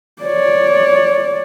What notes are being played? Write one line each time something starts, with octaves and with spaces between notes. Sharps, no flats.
C#5 D5